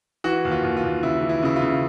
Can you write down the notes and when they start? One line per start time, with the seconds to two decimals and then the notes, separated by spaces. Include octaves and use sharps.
0.24 E3 F#4
0.45 D#2
0.51 F4
0.63 D#2
0.77 F4
0.84 D#2
1.03 C#3 E4
1.22 E3
1.29 E4
1.43 C#3 E4
1.56 F4
1.62 C#3